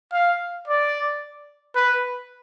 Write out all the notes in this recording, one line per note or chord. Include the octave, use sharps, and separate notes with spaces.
F5
D5
B4